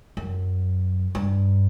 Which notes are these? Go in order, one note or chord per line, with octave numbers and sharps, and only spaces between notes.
F#2
G2